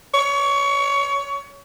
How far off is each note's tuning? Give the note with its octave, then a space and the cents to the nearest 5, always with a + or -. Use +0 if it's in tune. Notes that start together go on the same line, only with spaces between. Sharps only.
C#5 +25